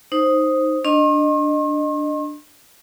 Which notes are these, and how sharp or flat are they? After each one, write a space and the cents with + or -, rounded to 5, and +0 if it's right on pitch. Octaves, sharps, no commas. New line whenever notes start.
D#4 +0 C5 +10
D4 +5 D#5 -20 C6 +45